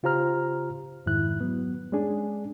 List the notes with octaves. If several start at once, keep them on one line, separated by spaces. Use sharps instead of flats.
C#3 F4 G4 C5 A#5 F6
F2 G#2 D#3 E4 F#6
F#3 B3
G#3 C#4 D4 G#4